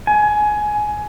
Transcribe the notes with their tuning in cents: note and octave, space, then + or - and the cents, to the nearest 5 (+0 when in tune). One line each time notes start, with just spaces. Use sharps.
G#5 +20